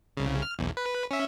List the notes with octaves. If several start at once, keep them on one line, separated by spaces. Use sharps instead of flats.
C2 C#3
F6
B1 E2
B4
C#4 E5